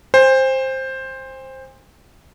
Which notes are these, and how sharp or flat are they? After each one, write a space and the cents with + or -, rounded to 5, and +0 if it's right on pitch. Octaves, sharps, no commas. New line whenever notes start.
C5 +10 G#5 -45